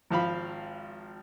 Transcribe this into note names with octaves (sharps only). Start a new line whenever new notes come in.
G#1 F3 F5 B5